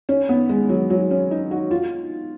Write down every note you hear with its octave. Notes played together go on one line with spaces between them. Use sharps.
C#4
B3
G#3
F#3
F#3
C#4
D#4
F#4
F4